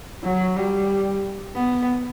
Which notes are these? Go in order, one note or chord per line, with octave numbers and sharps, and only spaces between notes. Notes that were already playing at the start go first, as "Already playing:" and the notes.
F#3
G3
B3